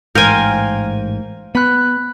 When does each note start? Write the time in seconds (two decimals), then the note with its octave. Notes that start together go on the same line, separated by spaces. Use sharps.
0.15 A1 G#2 A#4 C5 F5 G5 G#5 G6
1.55 B3 B5 F#6